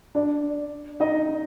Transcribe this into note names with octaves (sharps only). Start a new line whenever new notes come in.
D4 D5
D#4 D#5